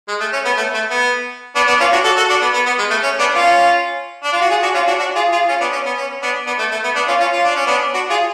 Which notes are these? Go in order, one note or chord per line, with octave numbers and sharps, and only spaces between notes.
G#3
A3
C#4
B3
A3
A3
B3
B3 D4
B3 D4
C#4 F4
D4 F#4
F#4 A4
F#4 A4
D4 F#4
B3
B3
B3
G#3
A3
C#4
B3 D4
C#4 F4
D4
F4
F#4
F4 G#4
D4 F#4
C#4 F4
D4 F#4
D4 F#4
F4 G#4
F4 G#4
C#4 F4
B3 D4
C#4
B3
C#4
B3 D4
B3 D4
A3
A3
B3
B3 D4
C#4 F4
C#4 F4
F4
D4
C#4
B3 D4
D4 F#4
F4 G#4